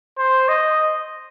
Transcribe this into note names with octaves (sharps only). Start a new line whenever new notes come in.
C5
D#5